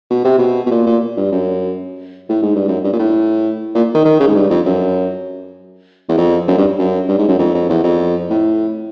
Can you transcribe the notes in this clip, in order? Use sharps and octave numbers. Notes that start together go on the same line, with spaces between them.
B2
C3
B2
B2
A#2
A#2
G2
F#2
A2
G#2
G2
F#2
G2
A#2
A2
A#2
D#3
D#3
C#3
G#2
G2
F2
F#2
E2
F2
F#2
G2
F#2
G2
G#2
F#2
F2
F2
E2
F2
A2